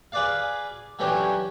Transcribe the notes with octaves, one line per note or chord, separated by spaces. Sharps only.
G#4 B4 D5 F5
D3 E3 F#3 C#4 G4